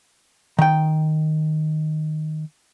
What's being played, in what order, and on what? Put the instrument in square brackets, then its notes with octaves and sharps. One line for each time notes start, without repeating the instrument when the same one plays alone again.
[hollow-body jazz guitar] D#3 G5